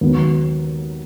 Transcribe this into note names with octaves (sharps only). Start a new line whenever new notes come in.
D#2 D#3 F#3 B3